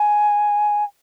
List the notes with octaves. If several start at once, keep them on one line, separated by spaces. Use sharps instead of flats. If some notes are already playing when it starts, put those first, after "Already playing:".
Already playing: G#5